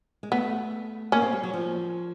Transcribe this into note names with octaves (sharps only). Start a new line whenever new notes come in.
G#3
A3 B3
A#3 C#4
C4
G3
F#3
F3